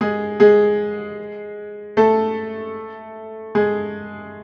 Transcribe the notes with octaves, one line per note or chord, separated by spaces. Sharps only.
G#3 G#4
G#3 G#4
A3 A4
G#3 G#4